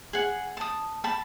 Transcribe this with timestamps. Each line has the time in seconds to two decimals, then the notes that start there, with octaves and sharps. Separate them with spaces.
0.13 G#4 F#5
0.57 A5 D#6
1.04 A5 B5